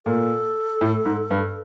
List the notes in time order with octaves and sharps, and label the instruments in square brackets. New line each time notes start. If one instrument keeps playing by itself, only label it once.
[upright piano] A#2 [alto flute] A4
[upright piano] A2
G#2
G2